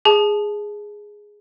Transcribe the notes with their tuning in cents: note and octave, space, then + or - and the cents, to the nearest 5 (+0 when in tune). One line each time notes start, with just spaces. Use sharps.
G#4 +0 A5 -25